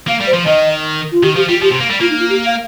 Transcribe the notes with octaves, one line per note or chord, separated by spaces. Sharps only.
A#3 F5
G3
C5
F3
D#3 D#5
F4
D#3 G4
F3 G4
G3 F4
F3 G4
C3
A#3
G3
A#3 F4
D#4
F4
G4
F5